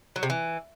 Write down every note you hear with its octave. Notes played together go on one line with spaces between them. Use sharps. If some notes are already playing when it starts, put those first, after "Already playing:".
F#3
C3
E3